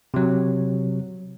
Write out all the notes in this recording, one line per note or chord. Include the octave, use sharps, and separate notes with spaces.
C3 F#3